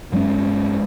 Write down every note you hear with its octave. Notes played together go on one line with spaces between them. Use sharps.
G2 F#3 G#3 C#4